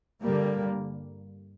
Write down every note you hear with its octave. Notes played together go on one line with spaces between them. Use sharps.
G2 D3 G3 A#3